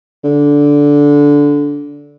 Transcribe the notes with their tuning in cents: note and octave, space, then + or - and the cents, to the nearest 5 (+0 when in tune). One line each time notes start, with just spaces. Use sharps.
D3 -15